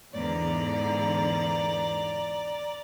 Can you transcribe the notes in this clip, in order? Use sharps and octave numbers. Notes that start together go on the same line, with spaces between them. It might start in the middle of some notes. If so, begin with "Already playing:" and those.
E2 G#2 D3 D5 A#5